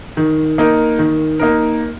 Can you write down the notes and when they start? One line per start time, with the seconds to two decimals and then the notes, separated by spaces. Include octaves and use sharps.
0.17 D#3
0.58 A#3 D#4 A#4
0.99 D#3
1.39 A#3 D#4 A#4